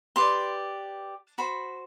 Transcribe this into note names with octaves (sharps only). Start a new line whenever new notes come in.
G4 B4 D5 C6
F#4 C5 B5